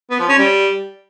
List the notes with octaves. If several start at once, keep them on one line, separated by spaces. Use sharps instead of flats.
B3
F3
C#4
G3